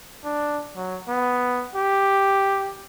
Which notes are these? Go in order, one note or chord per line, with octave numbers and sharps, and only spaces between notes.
D4
F#3
B3
G4